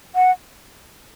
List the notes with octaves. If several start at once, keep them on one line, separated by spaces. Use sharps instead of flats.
F#5